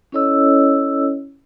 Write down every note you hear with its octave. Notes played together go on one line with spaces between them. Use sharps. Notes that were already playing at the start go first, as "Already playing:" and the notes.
C#4 E4 A4 C#5 D#5 E6